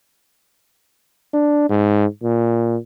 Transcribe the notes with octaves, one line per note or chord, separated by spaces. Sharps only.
D4
G#2
A#2